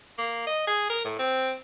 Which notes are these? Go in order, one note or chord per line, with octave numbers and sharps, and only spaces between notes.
A#3
D#5
G#4
A#4
A2
C4